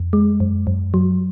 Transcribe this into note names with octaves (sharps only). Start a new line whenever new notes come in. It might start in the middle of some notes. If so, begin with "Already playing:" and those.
Already playing: F2
G#3
F#2
F#2
F#3